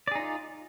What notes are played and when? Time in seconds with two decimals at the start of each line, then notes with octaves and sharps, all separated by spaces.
0.08 D5
0.11 G#4
0.15 D#4
0.19 F4